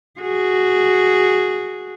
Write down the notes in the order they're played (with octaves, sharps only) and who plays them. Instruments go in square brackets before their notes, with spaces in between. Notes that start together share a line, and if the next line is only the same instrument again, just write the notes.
[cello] F#4 G#4